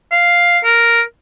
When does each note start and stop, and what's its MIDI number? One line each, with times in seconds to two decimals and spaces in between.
0.11 0.59 77
0.64 1.02 70